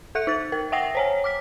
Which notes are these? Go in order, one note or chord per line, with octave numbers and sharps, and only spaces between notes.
A4 E5 F#6 C#7
D#4 A6
A#4
E5 F#5 G5 A#6 C7
C5 C#5 G#5
D6 F6 B6